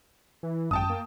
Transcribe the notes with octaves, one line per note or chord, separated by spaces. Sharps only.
E3
G#1 F#2 G5 A5 D#6
A#3